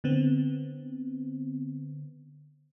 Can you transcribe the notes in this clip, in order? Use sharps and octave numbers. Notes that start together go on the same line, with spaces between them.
D3 B3 C4